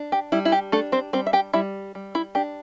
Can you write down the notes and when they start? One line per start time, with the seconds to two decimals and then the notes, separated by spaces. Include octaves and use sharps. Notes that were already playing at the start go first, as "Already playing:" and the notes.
Already playing: D4
0.12 G4
0.32 G3 E4
0.45 E4
0.52 G4
0.72 A3 D4 A4
0.92 C4 C5
1.13 G3 C4 C5
1.27 E5
1.33 G4 G5
1.53 G3 E4 E5
1.95 G3
2.15 E4
2.35 D4 G4